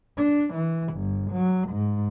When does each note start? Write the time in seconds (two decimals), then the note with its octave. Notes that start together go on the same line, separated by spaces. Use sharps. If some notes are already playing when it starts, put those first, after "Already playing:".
0.17 D4
0.54 E3
0.94 G1
1.31 F#3
1.69 G#2